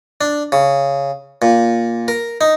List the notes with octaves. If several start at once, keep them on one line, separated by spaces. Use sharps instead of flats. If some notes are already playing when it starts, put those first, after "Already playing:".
D4
C#3
A#2
A#4
D#4